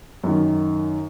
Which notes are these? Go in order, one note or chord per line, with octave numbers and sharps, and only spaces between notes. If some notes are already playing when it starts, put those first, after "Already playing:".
F#2 D#3